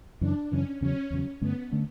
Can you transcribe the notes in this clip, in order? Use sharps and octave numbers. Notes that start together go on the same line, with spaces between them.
F#2 C#3 E3 D4
F#2 C#3 E3 C#4
E2 C#3 F#3 C#4
E2 C#3 F#3
G2 D3 A3 B3 C#4
D3 A3 C#4